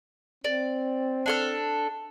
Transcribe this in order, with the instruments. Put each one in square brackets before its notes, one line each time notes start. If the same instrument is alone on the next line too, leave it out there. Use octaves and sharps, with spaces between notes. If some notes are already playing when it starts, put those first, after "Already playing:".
[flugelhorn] C4 [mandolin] D5
[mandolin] D4 A4 F6